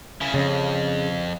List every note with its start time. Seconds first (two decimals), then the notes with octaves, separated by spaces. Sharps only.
0.21 C#3 E4
0.34 F2 C#3